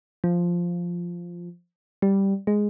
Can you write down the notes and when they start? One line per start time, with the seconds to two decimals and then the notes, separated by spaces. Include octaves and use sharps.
0.24 F3
2.02 G3
2.47 G#3